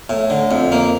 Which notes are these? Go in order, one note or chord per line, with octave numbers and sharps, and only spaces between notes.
A2
D3
F2
A#3